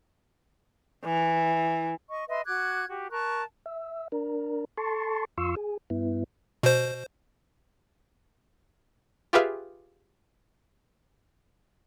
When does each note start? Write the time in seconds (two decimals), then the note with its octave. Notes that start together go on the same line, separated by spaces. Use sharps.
1.05 E3
2.09 D#5 C#6
2.29 B4 D#5 E5 C6
2.46 F#4 D6 F#6 G#6
2.89 F#4 G4
3.11 A#4 A5 C#6 F#6
3.66 E5
4.12 D4 A#4
4.78 A4 A5 C6 C#6
5.38 F2 F4 C6 C#6 E6
5.56 G#4
5.90 G2 B3 E4
6.63 B2 C5
9.33 F4 G4 G#4 B4 E5 F5